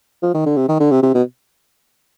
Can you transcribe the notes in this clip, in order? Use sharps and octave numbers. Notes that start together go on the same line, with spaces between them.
F3
D#3
D3
C3
D#3
D3
C3
C3
B2